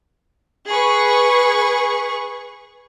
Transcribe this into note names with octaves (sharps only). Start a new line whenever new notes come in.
G#4 B4 C#6